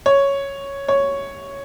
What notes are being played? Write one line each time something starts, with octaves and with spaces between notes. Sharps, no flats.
C#5
C#5